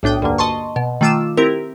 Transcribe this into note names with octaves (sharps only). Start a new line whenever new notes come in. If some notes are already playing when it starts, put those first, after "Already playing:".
B1 A2 D4 G5 D#6
D2 G2 D3 A#3
D#5 A5 C6 C#6
B2
D#3 A3 F4 D6 E6 E7
C4 E4 G4 A#4